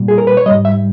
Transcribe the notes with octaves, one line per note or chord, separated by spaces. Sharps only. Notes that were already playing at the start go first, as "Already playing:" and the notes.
Already playing: A#2 G3
G#4
A#4
B4
C#5
G#2 G3 D#5
E5